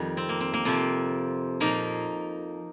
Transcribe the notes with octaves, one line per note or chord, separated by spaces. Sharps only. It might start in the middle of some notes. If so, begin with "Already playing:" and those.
Already playing: F2 D#3 G3
C4
A#3
C4
A#3
F2 C3 F3 C4
A#2 F3 A#3 D#4